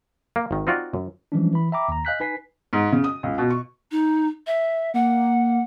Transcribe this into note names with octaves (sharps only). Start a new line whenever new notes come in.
A#3
G#1 D#3
C4 D#4 F4 F#4 D5
F#2
E3 F3 G3 G#3 C#4 D4
E3 B5
E5 G5 A#5 B5 D6
D#2 A#5
D#5 F5 G#5 F#6 G6 B6
D#4 B4 G#5 B6 C7
G#2
C#3
D#6
C#2
B2
C#6
D#4
E5
A#3 F#5